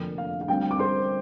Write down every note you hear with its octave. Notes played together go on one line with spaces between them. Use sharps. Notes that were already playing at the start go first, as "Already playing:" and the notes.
Already playing: F1 F2 D3 A#3 D4
F5
F5
D2 D3 G3 C4 G5
D6
C5 C6